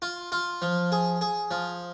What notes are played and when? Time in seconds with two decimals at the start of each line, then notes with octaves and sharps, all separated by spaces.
0.02 F4
0.32 F4
0.62 F3
0.92 G#4
1.21 G#4
1.51 F3